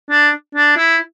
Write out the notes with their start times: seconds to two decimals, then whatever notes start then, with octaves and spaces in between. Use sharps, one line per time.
0.10 D4
0.55 D4
0.77 E4